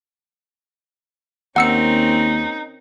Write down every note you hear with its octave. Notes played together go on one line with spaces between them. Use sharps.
D#2 C4 C#4 D#4 A#4 F#5 E6 C#7